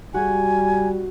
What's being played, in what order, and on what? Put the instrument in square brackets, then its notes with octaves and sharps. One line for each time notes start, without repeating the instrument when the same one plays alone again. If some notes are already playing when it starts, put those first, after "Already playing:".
[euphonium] G3 [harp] F#4 [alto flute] G#5